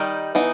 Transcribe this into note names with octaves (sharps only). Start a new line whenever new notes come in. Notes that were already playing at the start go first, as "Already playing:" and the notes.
Already playing: D#3 G3 D#4
E3 B3 D#4